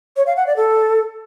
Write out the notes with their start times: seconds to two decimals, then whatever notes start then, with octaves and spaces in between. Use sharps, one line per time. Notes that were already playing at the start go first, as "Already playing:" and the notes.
0.17 C#5
0.27 F5
0.37 F#5
0.47 D5
0.57 A4